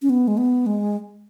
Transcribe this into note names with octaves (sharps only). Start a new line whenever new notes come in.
C#4
B3
G#3
B3
G#3